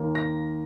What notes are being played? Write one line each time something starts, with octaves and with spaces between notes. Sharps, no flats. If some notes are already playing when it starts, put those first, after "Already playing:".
Already playing: D#2 D#3 A#3
A#6